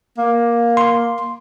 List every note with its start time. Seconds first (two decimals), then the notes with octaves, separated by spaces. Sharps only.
0.18 A#3
0.77 C6